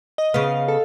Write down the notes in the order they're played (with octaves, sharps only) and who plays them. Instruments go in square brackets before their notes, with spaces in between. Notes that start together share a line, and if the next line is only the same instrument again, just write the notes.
[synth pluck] D#5
[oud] C#3 B3 [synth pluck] F5
[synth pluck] A4